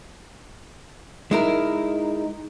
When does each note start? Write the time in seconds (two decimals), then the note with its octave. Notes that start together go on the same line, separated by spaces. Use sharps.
1.31 G#3 D#4 E4 A#4